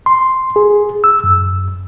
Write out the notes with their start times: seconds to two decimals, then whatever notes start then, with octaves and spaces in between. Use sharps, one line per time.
0.06 C6
0.56 G#4
1.04 E6
1.24 F#2